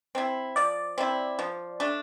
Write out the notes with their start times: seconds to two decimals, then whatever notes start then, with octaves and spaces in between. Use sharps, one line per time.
0.15 C4 E4
0.56 F3 D5
0.98 C4 E4
1.39 F3
1.80 A3 D4